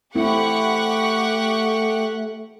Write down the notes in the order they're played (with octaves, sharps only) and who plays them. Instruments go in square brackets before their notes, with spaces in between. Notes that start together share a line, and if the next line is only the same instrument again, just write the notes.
[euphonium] A3 [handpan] C4 E4 [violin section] G4 F#5 C#6